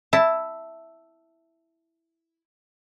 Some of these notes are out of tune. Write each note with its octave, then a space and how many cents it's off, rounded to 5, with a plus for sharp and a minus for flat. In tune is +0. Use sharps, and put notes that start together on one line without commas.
E4 +0 A5 +5